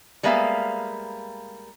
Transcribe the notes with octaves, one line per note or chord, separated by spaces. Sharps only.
G3 G#3 A#3 B3 E5 F5